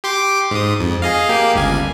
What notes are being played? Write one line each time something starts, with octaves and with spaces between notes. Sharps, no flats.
G4 C6 D6
G#2 D#6
F2
G#4 D#5 F5
A#3 G4 F5
G1 C#2 G#5